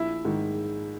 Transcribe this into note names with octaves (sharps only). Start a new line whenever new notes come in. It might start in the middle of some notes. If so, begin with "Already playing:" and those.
Already playing: A#1 E4 E5
G#2 D#3